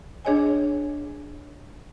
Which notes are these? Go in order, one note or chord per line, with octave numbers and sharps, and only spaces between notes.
D4 G#4 C#5 D#5 G#5